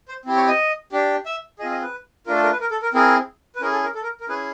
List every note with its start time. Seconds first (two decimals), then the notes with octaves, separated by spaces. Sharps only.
0.08 C5
0.25 C4 E4 G4
0.36 C#5
0.48 D#5
0.92 D4 G4
1.26 E5
1.59 C4 F4 G#4 D#5
1.70 D#5
1.82 B4
2.26 A3 D4 F4 A#4
2.35 A4
2.43 A#4
2.52 B4
2.61 A#4
2.71 A4
2.82 A#4
2.94 C4 E4 G#4 A#4
3.55 B4
3.61 C#4 E4 G#4 A#4
3.72 A4
3.84 A#4
3.95 A4
4.03 A#4
4.20 A#4
4.28 C#4 E4 G#4 B4